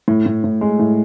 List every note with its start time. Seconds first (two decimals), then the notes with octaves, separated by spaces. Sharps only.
0.08 A2
0.26 A2
0.44 A2
0.61 G#3
0.79 A2